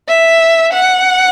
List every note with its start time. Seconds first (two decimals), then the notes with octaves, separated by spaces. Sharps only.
0.09 E5
0.73 F#5